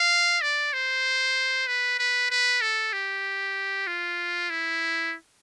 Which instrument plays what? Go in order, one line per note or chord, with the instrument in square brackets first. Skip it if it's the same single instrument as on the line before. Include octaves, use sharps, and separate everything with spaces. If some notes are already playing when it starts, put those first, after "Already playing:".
Already playing: [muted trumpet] F5
D5
C5
B4
B4
B4
A4
G4
F4
E4